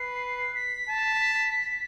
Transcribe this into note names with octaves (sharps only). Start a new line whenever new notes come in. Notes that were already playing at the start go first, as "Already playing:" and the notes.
Already playing: B4 C7
B6
A5